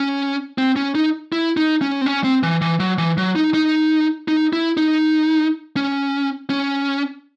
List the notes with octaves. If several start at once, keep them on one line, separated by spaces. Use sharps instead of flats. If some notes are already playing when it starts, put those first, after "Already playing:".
Already playing: C#4
C4
C#4
D#4
E4
D#4
C#4
C4
C#4
C4
E3
E3
F#3
E3
F#3
D#4
D#4
D#4
E4
D#4
C#4
C#4